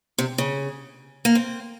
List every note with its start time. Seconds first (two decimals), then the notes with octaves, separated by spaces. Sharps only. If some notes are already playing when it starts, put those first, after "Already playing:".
0.18 C3
0.38 C#3
1.25 A#3
1.35 C4